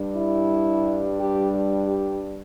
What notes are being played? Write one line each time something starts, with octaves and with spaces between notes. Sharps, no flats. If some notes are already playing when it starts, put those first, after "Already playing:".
Already playing: G2 G3 D4
E4
G4
G4
G4